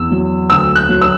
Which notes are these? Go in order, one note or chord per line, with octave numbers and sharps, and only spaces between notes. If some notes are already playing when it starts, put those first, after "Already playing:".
Already playing: E2 E6
F#3
D2 E6
F#6
F#3
E6